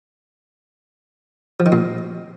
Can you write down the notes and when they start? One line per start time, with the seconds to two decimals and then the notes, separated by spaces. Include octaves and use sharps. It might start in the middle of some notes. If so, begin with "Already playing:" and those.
1.60 F3
1.66 D#3
1.72 A#2